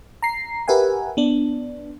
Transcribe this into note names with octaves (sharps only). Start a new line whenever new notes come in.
A#5 C7
G4 A#4 B4 E5 F#5 G#5
B3 D4